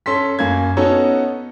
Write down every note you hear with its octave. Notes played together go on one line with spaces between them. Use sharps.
C#4 A4 C6 B6
F#2 A#3 G#6
B3 C#4 D#4 F#4 A4 C#5